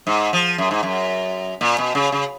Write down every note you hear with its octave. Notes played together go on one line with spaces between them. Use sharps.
G#2
F3
F#2
G#2
F#2
A#2
B2
C#3
C#3